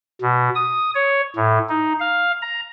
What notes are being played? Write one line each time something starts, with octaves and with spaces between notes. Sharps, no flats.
B2
D#6
C#5
A2
D#4
F5
A#5